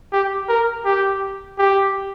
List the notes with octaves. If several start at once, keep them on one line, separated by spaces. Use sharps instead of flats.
G4
A#4
G4
G4